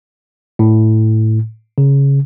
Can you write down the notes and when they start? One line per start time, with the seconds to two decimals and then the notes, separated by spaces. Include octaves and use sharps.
0.59 A2
1.78 C#3